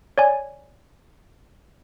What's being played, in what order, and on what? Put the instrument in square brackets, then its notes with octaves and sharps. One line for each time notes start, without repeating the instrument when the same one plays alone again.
[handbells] C#5 D5 G#5